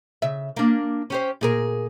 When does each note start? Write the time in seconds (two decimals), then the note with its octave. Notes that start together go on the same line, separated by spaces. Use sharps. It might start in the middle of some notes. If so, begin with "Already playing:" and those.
0.22 C#3 E5
0.57 A#3 D4
1.10 C#4 G4 C5
1.41 A#2 G#4 A#4